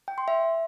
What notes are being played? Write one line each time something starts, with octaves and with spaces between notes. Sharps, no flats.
G5
C6
E5